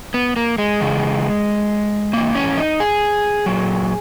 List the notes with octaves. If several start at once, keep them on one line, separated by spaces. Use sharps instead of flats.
B3
A#3
G#3
E2 C#3 E3
G#2 E3 A#3
C#4
D#4
G#4
A#2 F#3